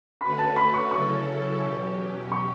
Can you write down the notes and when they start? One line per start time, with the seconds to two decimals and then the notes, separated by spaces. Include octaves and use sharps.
0.21 D3 A3 C#4 F#4 B4 B5
0.39 A5
0.56 B5
0.74 C#6
0.91 C#3 F#3 C#4 E4 A4 C#6
1.61 E2 B2 F#3 C#4 G4
2.32 C#6